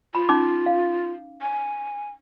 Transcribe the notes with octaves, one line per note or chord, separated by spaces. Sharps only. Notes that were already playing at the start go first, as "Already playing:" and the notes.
F4 B5
C#4 D#4 D6
F5
G#5